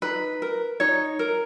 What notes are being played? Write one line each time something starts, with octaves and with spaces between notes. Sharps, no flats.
D#4 B4
A#4
D#4 C#5
A#4